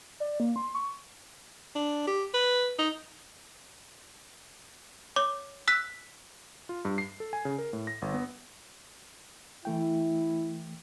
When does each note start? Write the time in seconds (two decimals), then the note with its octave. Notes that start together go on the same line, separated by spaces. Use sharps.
0.20 D5
0.40 A#3
0.56 C6
0.75 C#6
1.75 D4
2.07 G4
2.34 B4
2.79 D#4
5.16 C#5 D6
5.68 E6 F#6 B6
6.69 F4
6.85 G2
6.98 C7
7.20 A4
7.33 G#5
7.45 C#3
7.58 A#4
7.73 A2
7.87 A#6
8.02 G1
8.14 B3
9.65 E3 A3 E4 G5